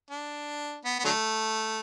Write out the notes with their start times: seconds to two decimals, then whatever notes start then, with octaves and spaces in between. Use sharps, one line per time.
0.11 D4
0.85 B3
0.99 B3
1.05 D3 F#3 A3